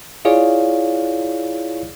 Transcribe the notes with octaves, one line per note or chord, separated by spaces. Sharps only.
E4 F4 G#4 C#5 D5 F5